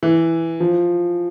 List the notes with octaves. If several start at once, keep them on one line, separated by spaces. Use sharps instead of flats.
E3
F3